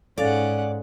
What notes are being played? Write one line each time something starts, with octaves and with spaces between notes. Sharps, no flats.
G#2 C#4 A4 D5 F5 F#5 A6